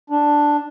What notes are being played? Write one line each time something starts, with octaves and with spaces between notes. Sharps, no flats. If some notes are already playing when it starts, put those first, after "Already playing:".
D4